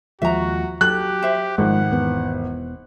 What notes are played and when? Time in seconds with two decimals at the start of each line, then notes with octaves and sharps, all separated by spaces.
0.22 D#2 F3 G#3 F#4 E5 A#5
0.81 F#3 G4 A4 F#6
1.23 C5 E5
1.58 G#1 F3 G#3 F#5
1.90 E1 E2 B3